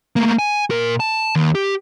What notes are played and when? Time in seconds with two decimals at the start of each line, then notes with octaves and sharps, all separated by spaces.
0.16 A3 A#3
0.39 G#5
0.71 A#2 A#4
1.00 A5
1.36 D#2
1.55 G4